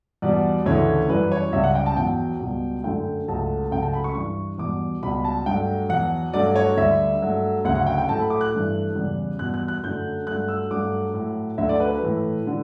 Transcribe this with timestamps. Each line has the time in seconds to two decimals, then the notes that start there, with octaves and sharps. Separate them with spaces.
0.22 E2 B2 G3 D5
0.66 D2 C#3 E3 A3 C#5
1.09 F#2 E3 G3 B4
1.32 C#5
1.53 C#2 C#3 G3 E5
1.64 F#5
1.75 G5
1.86 A5
1.97 E2 B2 F#3 G5
2.40 C#2 B2 G3
2.84 F#2 D3 A3 G5
3.28 C#2 C#3 F#3 A3 A5
3.71 C#2 C#3 F#3 A3 G5
3.82 A5
3.94 B5
4.04 C#6
4.15 G2 E3 G3 C#6
4.58 E2 B2 G3 D6
5.03 C#2 B2 G3 B5
5.25 A5
5.46 G2 F#3 A3 G5
5.89 E2 B2 F#3 F#5
6.34 G2 F#3 A3 D5
6.56 C#5
6.77 D2 D3 G3 E5
7.22 G2 F#3 A3
7.64 D2 C#3 F#3 F#5
7.75 F#5
7.86 G5
7.98 G5
8.09 A2 F#3 A3 A5
8.20 B5
8.30 D6
8.41 F#6
8.52 G2 E3 A3
8.95 E2 C#3 G3
9.39 E2 B2 G3 F#6
9.54 F#6
9.68 F#6
9.83 F#2 D3 F#3 A3 G6
10.27 G2 F#3 A3 F#6
10.48 E6
10.70 G2 F#3 A3 D6
11.14 A2 F#3 A3
11.58 D2 D3 F#3 A3 E5
11.69 D5
11.80 B4
11.90 B4
12.02 A2 E3 A3
12.47 D3